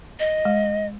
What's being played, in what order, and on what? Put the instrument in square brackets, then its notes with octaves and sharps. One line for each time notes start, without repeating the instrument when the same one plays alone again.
[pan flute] D#5
[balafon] G#3